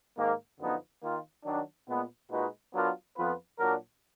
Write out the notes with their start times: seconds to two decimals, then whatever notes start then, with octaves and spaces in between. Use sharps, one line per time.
0.16 G#2 D#3 A#3
0.59 F#2 D3 F3 B3 D#4
1.02 D#3 A#3 F4
1.45 D#3 F#3 D4
1.88 A#2 G#3 B3
2.30 A#2 G#3 D#4 F#4 B4
2.73 F#3 B3 D4 F4 A#4
3.16 F2 F3 B3 F4 B4
3.59 A#2 F#3 D4 F#4 A#4